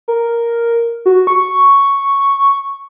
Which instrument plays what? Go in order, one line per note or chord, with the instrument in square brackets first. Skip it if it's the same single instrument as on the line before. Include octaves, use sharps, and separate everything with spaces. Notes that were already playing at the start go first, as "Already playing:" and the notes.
[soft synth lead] A#4
F#4
C#6